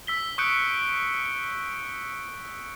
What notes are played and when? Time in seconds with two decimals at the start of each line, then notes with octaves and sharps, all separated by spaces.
0.07 E6 B6 G7
0.38 C#6 D#6 F#6 G6 C#7 D7